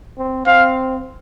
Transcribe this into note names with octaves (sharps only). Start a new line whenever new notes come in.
C4
C4 F5